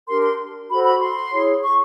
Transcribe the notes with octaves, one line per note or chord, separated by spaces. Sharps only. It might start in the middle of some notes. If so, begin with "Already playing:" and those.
D4 G4 A#4 C6
C6
F#4 A4 C5 B5
B5
C6
E4 G#4 C#5
C#6